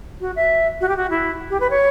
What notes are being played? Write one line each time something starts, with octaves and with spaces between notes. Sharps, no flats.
F#4
E5
F#4
G4
F#4
E4
G4
B4
C#5